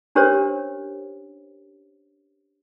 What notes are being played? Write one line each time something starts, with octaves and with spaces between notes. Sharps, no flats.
C#4 D4 G4 A#4 C5 C#5